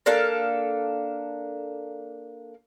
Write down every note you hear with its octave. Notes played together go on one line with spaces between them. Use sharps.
A#3 D4 A4 F5